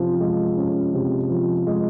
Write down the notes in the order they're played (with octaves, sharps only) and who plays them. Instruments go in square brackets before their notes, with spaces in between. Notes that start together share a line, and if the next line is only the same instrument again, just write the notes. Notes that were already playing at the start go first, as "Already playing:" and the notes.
Already playing: [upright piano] C3 F3 C#4
G#3
C#4
C3
F3
G#3